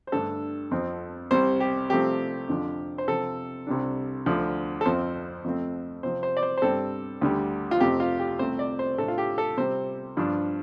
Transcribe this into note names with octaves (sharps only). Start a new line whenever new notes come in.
C5
G2 D3 A3 D4 A4
F2 F3 C4
C2 C3 G3 C5
G4
C2 C3 F3 A3 C4 G4
F2 D3 F3 D4
C5
C3 F3 C4 A4
C2 C3 G3 D4
D2 D3 F3
A4
F2 F3 C4 C5
F2 F3 A3 C4
C3 F3 C4 C5
C5
D5
C5
C5
G2 G3 C4 A4
D2 D3 G3
F4
F2 C3 A3 C4 G4
F4
G4
C2 C3 A3 C4 C5
D5
C5
A2 A3 D4 A4
F4
G4
A4
C3 G3 C4 C5
G2 F3 D4